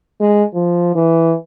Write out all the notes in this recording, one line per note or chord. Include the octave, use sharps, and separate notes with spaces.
G#3
F3
E3